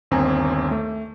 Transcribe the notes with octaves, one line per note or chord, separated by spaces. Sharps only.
G1 D#2 C4 G#5 A#5
A3